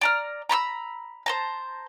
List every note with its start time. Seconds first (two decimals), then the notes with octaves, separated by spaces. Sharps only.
0.01 D5 A#5 F6
0.49 A#5 B5 C#6 E6
1.26 C5 A5 A#5